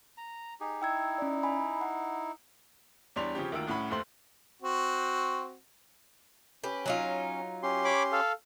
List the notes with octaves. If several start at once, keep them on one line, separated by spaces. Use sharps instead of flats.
A#5
D#4 G4 G#4
D#4 E4 G5 E6 G#6
C#4 D5
G#5 B5
F#5
E2 G3 D4 C#5 C6 F7
C#3 F3 C4 C#4 G4
D2 D#3 A#3 F4 E6 D7
C2 A2 C#4 F#5 B5
F1 D#2 A3 C5 C6 F#7
C4 F#4
C#4 G4 B4
F#3 D#4 F4
C#4 G4 C6
C#5 B5 D6
A4 F5